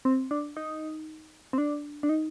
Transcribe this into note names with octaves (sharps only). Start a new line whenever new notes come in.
C4
D4
D#4
C4
D4
D4
D#4